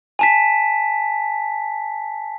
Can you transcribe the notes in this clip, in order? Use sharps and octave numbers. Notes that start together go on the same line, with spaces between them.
G#5 A5 B6